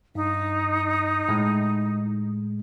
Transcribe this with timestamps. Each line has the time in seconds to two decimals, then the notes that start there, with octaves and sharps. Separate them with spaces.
0.15 G2 D#4
1.29 A2 G#3